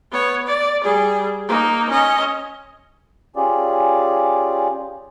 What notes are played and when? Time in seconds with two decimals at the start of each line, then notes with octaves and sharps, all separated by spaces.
0.11 B3 C#5
0.47 D5
0.84 G3 G#4
1.48 A#3 D#4
1.90 C#4 D#5
3.36 C#4 F4 G4 G#4 D5